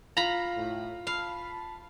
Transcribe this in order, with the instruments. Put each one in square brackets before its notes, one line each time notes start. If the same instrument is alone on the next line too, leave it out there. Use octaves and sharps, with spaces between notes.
[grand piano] F4 [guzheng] A#5 B5
[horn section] A2
[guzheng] F5 [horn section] A5 B5